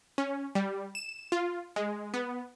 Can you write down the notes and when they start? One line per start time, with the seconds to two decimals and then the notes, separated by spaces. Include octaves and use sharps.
0.18 C#4
0.55 G3
0.95 E7
1.32 F4
1.76 G#3
2.14 B3